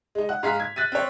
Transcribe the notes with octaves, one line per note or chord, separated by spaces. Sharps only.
G#3 D#4
F#5
G#2 G#4 F5 A#5 F6 B6
G#6
F#6 A6 B6 D#7
C4 C#5